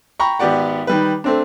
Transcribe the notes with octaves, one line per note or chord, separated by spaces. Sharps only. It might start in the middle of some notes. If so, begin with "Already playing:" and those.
G5 A#5 B5 C#6
G#1 B3 G4 D5 F#5
D#3 G3 B4
A3 C4 D4